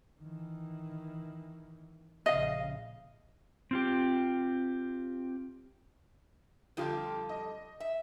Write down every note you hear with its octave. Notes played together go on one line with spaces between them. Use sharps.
D#3 E3
A#1 C#3 D#5 F5
C4 F4 G4
F2 D3 G3 F4 G4
D#5
E5